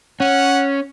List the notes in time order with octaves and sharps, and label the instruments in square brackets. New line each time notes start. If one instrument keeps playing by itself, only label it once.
[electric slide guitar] C#4 [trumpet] F#5